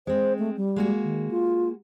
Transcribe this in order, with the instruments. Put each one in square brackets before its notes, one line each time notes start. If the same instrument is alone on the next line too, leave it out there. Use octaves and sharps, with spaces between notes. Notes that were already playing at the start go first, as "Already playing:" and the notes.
[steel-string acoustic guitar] G#3 C4 [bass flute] C5
[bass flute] A3
G3
[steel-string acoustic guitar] G#3 A#3 F#4
[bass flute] D#3
F4